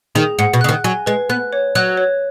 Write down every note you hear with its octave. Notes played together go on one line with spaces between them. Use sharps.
D#3 G#4
G#2 F#5
B2
C#3 F#6
D#3
F#3 G#5
G#3 B4
B3 F#6
C#5
F#3 F#6
C#5